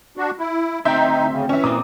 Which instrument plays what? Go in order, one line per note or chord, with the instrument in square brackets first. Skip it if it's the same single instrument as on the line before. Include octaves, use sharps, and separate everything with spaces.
[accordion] D4 F#4
E4
[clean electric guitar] D2 C4 G5 [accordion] D#4 [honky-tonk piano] E5 C6 G6
[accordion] C#3
[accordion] E3 [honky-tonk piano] C#4 E5
[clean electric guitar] A#2 C4 [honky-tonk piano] A#5 D6 D#6